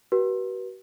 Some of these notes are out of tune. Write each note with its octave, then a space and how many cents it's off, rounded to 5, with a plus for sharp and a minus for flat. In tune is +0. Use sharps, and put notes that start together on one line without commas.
F#4 +45 B4 -35